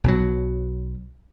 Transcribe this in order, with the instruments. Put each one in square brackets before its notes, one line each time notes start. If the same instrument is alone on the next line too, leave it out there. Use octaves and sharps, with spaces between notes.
[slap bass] B1 B2 F#3